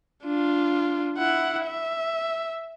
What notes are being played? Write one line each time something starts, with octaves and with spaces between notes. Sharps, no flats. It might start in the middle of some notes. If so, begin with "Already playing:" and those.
D4 F4
E4 F#5
E5